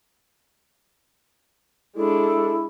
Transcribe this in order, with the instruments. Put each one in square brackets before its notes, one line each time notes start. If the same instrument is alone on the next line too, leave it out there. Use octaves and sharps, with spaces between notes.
[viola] G#3 D4 [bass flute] E4 [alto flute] A4